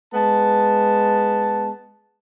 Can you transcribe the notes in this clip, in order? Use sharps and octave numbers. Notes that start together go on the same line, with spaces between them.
G#3 B3 A5